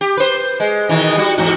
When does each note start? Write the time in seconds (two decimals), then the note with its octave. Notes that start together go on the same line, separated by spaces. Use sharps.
0.01 G4
0.17 B4 C5
0.60 G#3
0.89 B2 D#3 E3
1.17 G3 F#4
1.38 E2 G#2 F#4